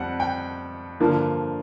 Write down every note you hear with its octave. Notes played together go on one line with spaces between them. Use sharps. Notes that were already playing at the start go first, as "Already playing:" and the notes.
Already playing: F2 G3 C4 F#5
G5
G2 D3 F3 A#3